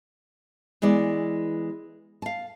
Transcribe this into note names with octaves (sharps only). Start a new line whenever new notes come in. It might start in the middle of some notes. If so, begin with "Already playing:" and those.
E3 G#3 B3 D5
F5 A5